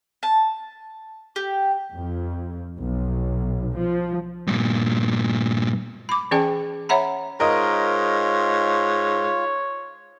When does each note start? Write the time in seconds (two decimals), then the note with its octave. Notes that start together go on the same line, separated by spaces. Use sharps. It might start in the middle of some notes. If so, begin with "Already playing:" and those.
0.23 A5
1.36 G4
1.94 F2
2.77 B1
3.76 F3
4.47 G2 A#2
6.09 B5 D6
6.31 E3 C#4 G#4 D5 G5 A5
6.89 C#5 E5 F#5 A#5 B5
7.40 G#2 F4 A#4 C#5 D#5